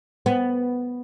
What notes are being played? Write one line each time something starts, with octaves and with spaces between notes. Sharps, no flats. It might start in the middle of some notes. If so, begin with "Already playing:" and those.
B3